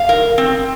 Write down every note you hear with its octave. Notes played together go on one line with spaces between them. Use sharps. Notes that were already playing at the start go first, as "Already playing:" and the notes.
Already playing: F5
A#4
C4